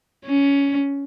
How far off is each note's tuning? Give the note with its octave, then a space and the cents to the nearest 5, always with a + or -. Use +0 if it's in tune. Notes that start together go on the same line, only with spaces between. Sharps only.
C#4 +15